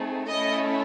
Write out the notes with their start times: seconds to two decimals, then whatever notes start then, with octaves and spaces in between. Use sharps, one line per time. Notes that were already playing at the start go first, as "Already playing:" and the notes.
Already playing: A3 C4 D#4 G#4
0.27 A3 C#4 E4 A4 D#5